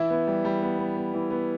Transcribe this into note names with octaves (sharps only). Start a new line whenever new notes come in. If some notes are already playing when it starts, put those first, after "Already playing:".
Already playing: E3 E4 E5
B3
G3
G3
B3
B3
B3
E3
B3